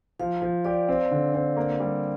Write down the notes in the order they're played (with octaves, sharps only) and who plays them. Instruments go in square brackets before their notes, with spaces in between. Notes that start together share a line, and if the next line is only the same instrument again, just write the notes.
[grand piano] F3 [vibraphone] F5
[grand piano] F3
[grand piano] G4 [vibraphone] D5
[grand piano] C4
D3
C4
A#3
G3